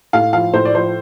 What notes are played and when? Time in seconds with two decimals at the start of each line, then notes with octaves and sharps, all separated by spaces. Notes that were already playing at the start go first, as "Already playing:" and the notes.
0.13 A2 F5
0.33 F3 F5
0.53 A2 C5
0.65 D5
0.75 F3 C5